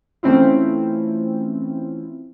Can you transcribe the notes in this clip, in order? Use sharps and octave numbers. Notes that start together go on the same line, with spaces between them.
E3 A3 C4 C#4 E4 F4